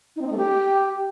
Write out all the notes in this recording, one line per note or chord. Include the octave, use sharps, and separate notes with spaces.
D#4
C4
D#4
A3
G4